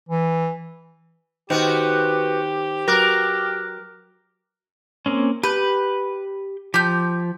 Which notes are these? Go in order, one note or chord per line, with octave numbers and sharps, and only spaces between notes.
E3
D#3 B3 F#4 G4 C5
F#3 A#4 D6 F#6 A#6
A#3 C4 C#4
G4 B4 G6
F3 G4 G6